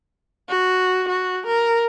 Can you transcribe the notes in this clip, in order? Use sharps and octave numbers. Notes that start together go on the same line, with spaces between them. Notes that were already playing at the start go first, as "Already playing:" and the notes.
F#4
F#4
A#4